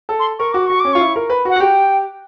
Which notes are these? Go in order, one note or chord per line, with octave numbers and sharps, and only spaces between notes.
A4
C6
A#4 C#6
F#4 D6
F#4 C#6
C#4 D6
F4 C#6
E4
A#4
B4
F#4
F#5
F#4
G4 G5